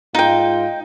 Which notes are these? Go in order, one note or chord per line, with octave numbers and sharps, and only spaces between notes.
G#2 D#4 F4 G5